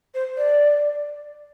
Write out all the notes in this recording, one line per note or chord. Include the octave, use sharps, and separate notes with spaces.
C5
D5